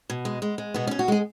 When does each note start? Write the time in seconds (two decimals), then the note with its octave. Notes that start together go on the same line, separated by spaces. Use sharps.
0.10 B2
0.25 G#3
0.42 G#3
0.58 G#3
0.74 B2 B3
0.87 B2 C#4
0.99 F#4
1.08 G#3 G#4